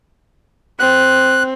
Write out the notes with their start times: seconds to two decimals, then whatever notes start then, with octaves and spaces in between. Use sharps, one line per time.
0.79 C4 F#6